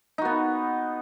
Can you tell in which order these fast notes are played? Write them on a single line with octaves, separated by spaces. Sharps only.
D#4 F#4 B3